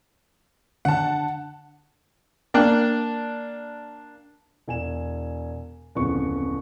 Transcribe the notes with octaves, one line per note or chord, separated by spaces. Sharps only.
D3 F#5 A5
A#3 D4 G5 F#6
E1 G#5 E7
D1 F2 C#3 B3 C#6